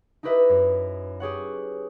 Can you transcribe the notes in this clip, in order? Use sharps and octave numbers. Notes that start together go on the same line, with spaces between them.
D#4 E4 G4 B4 D#5 E5
F#2
G4 G#4 C#5 F#5